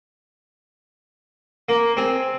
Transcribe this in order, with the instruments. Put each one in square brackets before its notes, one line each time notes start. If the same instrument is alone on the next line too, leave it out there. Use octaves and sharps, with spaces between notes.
[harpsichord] A#3
C4 G#4